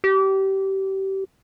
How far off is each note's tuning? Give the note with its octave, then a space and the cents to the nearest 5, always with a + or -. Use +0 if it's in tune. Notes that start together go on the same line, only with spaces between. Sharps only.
G4 -25